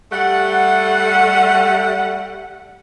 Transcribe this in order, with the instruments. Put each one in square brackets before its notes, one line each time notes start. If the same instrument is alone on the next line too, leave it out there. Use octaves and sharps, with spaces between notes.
[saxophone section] G3 A3 F#5